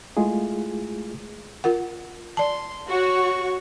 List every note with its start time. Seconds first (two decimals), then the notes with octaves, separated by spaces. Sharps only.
0.17 G#3 A3 E4 F4 G#4
1.64 F4 A#4 F#5
2.37 D5 A5 C6
2.90 F#4 C#5 C#6